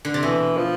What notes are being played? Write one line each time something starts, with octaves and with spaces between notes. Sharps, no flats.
D3
C3
B2 E3
F3